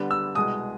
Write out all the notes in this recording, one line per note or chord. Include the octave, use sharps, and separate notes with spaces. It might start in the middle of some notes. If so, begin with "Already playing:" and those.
Already playing: D3 G3 B3 D4
E6
C2 B2 G#3 D#6